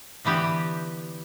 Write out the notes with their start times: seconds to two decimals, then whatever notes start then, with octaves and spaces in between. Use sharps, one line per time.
0.25 D3 E3 B3 G4